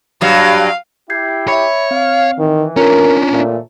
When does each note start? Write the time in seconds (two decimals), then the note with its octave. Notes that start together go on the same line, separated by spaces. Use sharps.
0.21 G2 F#3 F5
1.10 E4 G4 G6 G#6 C7
1.48 C#5 E5 B5
1.91 C4 F5
2.39 D#3 E3
2.76 C#4 D4 F4 A#4 C#5 A#5
3.32 G1 A#2 E3 A3